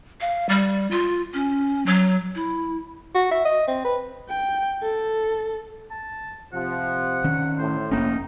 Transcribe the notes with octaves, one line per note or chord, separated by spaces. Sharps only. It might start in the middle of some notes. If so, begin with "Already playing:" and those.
F5
G3
F4
C#4
F#3
E4
F#4
E5
D#5
C4
B4
G5
A4
A5
C3 F3 F#5
D#3 C#4
A2 C5
F1 A#3 C#4 D#4